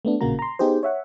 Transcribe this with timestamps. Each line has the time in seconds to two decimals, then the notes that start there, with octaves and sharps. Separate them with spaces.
0.05 A3 B3 D4
0.21 A1 A#2 C#3 A#3 F#4 A#5
0.39 A#5 C6
0.59 B3 D#4 G4 G#4 C5
0.83 C#5 E5 F#5